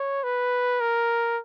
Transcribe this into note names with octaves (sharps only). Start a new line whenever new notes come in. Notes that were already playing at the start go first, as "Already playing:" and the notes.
Already playing: C#5
B4
A#4